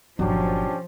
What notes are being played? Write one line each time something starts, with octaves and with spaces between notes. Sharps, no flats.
G1 A#2 F3 F#3 C#4 D4 G4